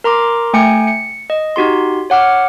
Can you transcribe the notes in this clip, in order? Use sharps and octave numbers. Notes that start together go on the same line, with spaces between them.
A#4 A#5 C6 D6
A3 G5 G#5 C#7
C#7
D#5
D#4 F#4 G4 C6
C#5 F#5 D6 F6